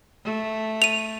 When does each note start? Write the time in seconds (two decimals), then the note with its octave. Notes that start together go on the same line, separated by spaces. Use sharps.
0.24 A3
0.82 D#7 F7